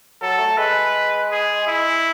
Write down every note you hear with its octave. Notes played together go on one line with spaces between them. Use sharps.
F#3 A4
A3
G#3 B4
G#4
E4